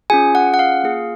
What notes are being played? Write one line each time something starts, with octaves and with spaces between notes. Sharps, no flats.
C#4 F4 G#4 G#5
F#5
F#5
F5
A#3 F4 G#4